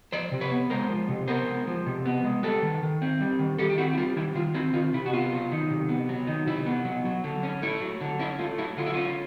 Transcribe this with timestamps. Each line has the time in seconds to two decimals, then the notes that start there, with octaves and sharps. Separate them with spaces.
0.12 F3 C5 D5
0.32 C3
0.41 B4 C#5
0.52 B3
0.70 G#3 A#4 C5
0.90 F3
1.09 C3
1.28 B3 A#4 C5
1.48 G#3
1.67 F3
1.86 C3
2.06 B3
2.24 G#3
2.43 G3 A4 B4
2.62 D#3
2.83 D#3
3.02 C4
3.21 G3
3.39 D#3
3.58 D#3 G4 A4
3.70 G4
3.78 C4 E4 F#4
3.93 E4
3.97 G3 F4
4.17 D#3 E4
4.35 D#3 F4
4.54 C4 E4 F#4
4.74 D#3 F4
4.94 C3 E4
5.06 F#4
5.13 B3 F4
5.32 F#3
5.52 D#3
5.70 C3
5.89 B3
6.09 F#3
6.27 D#3
6.46 C3 E4
6.66 B3
6.85 F#3
7.05 F#3
7.24 D3
7.43 C#4
7.62 A3 E4
7.81 F#3
8.01 D3
8.19 C#4 E4
8.39 A3 F4
8.58 F#3 E4
8.77 D3 F4
8.86 E4
8.94 C#4 F4